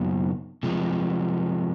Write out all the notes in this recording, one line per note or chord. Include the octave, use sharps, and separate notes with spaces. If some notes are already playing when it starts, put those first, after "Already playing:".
Already playing: F#2 C#3 F#3 B3 D#4
C3 F3 G#3